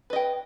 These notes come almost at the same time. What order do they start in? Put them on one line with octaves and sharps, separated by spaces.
B4 D#5 G5